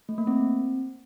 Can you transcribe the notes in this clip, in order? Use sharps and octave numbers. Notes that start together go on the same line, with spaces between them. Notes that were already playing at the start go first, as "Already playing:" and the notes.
A3
A#3
C4